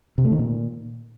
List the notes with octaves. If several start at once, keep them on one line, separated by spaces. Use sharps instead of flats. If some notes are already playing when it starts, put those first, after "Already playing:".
C3
A3
D#3
A#2